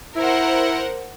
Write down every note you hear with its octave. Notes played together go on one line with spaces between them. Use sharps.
E4 A#4 C5 F#5